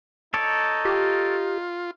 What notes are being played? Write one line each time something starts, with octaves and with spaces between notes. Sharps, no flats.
D#4 A4 C#5 D5
F4 G4